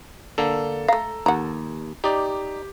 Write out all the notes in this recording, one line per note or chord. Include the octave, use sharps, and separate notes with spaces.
D3 A#3 A4
A3 F5 A#5
D#2 F#5 A#5
D#4 G4 D5